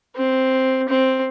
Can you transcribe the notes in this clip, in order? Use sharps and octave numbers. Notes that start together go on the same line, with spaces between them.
C4
C4